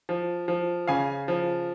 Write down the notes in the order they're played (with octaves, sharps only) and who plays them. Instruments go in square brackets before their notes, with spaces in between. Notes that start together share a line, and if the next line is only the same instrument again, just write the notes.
[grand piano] F3
F3
C#3 F5 G#5
F3